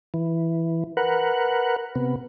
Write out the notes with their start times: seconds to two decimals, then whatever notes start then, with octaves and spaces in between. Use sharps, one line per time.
0.14 E3
0.97 A#4 B4 F#5
1.95 C3 B3